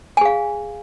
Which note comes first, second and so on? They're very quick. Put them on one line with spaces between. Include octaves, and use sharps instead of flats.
G#5 G#4 F5